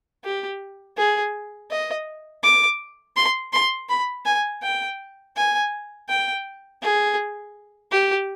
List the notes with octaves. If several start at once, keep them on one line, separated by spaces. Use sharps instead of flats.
G4
G#4
D#5
D6
C6
C6
B5
G#5
G5
G#5
G5
G#4
G4